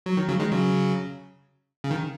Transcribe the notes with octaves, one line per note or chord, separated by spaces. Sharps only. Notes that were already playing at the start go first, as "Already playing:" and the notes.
F#3
D#3
C#3 F#3
D#3 G#3
C#3 F#3
C#3
D#3